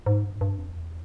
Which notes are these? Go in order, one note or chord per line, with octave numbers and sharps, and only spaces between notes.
G#2
G2
G#2
G2
F2
E2